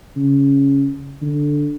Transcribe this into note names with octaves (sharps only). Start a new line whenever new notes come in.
C#3
D3